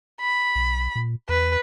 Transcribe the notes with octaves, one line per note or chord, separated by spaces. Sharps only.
B5
B1
A#2
E2 B4